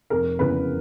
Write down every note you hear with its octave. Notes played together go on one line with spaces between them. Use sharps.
F1 A#4
E2 C#3 E3 B4